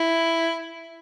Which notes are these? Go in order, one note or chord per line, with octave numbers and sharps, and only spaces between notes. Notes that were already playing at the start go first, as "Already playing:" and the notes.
Already playing: E4